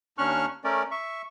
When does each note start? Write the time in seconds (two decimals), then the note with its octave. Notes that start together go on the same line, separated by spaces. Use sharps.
0.18 D#2 C#4 D4 C#6 F6 F#6
0.64 A3 C#4 A#4 D5
0.91 E5 C#6